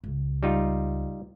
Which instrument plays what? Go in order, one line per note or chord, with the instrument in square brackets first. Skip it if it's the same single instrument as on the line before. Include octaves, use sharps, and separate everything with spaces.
[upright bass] C#2
[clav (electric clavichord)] G3 D#4 F4